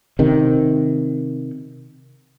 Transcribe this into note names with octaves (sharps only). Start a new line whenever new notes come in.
C3 D#3